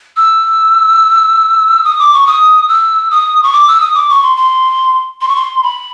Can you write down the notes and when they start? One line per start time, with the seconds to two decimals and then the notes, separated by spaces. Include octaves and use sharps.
0.17 E6
1.84 D#6
1.99 D6
2.13 C#6
2.27 D#6
2.69 E6
3.11 D#6
3.43 C#6
3.53 D6
3.68 E6
3.81 D#6
3.95 D6
4.09 C#6
4.23 C6
4.37 C6
5.21 C6
5.28 C#6
5.36 C6
5.63 B5